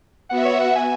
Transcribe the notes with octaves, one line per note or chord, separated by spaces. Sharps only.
B3 F#4 E5 F#5
C#5
F#5
G#5